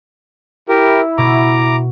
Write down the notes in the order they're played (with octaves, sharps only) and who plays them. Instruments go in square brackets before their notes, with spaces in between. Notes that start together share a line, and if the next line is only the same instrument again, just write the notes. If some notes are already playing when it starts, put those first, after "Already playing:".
[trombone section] E4 [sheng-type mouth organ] G4 A#4
[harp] B2 [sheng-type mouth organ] A#5 D6